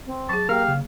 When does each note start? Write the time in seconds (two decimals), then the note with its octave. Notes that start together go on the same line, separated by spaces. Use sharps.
0.06 C4
0.29 F#3 G#4 A5
0.49 A#3 G4 A#4 F5
0.68 C#3